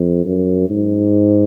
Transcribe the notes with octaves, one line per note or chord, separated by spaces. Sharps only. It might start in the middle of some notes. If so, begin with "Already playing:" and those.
Already playing: F2
F#2
G#2